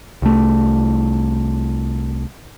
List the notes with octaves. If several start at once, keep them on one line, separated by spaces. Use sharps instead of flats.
C2 A3